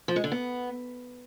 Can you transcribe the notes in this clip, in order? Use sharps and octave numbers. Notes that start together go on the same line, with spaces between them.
F3
G#3
D3
B3